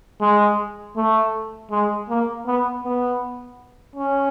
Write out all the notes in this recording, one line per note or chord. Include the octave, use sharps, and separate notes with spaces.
G#3
A3
G#3
A#3
B3
B3
C#4